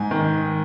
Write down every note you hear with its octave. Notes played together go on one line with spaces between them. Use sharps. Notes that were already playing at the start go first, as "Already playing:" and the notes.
Already playing: G#2 G#5
D#3